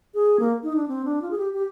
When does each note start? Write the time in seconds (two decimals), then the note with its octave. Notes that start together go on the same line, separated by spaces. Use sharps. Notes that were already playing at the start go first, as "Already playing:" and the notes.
0.14 G#4
0.40 A#3
0.63 D#4
0.76 D4
0.88 C4
1.05 D4
1.22 F4
1.31 G#4
1.38 G4
1.54 G4